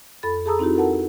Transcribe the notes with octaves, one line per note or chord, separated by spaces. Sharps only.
F2 A4 B5 A6
G#4 A4 A5 A#5 D#6 E6
C4 D#4 E4 F#4 G4
A4 A#4 F#5 A5